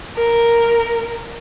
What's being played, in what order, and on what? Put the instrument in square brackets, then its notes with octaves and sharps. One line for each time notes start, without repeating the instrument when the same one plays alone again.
[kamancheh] A#4